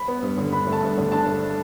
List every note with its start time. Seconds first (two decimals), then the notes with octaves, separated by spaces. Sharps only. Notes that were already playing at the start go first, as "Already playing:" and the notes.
Already playing: B5
0.08 B3
0.22 G2
0.38 D3
0.52 D4 B5
0.67 A3
0.72 A5
0.82 G2
0.97 D3
1.12 D4 A5
1.27 A3